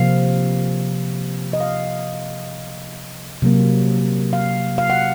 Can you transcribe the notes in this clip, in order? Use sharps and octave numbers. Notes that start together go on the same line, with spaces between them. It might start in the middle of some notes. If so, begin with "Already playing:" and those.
Already playing: C3 F3 A#3 F5
D#5
F5
C3 F#3 A#3
F5
F5
F#5